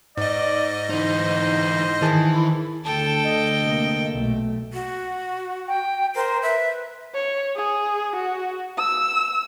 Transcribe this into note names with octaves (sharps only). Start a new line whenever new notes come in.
G#2 D5 D#5
E3 D#4 C5
D#3 E3 G#4 A5
D2 D3 A4 G5 A5
D#5
C3 A#3
B1 A#2 A3
F#4
G5
A#4 C5
B4 E5
C#5
G#4
F#4
E6